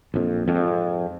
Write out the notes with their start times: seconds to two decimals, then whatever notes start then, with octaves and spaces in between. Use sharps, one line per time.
0.14 A#1 F2
0.48 F2 G#2